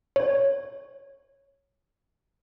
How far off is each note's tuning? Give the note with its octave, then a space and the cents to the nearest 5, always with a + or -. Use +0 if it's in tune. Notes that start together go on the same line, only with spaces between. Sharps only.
C#5 -5